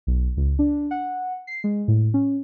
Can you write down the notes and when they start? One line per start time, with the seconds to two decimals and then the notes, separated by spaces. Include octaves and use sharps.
0.07 B1
0.37 C#2
0.59 D4
0.91 F#5
1.47 C7
1.64 G#3
1.88 A2
2.14 C#4